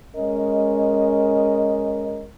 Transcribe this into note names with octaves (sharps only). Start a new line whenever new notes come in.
G#3 C#4 A#4 D#5